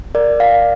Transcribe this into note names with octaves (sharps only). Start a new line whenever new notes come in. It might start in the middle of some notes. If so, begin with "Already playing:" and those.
A#4 D5
D5 F5